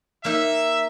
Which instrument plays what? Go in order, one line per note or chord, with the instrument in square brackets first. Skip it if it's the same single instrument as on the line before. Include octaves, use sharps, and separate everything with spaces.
[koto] A#3 D#4 [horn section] E5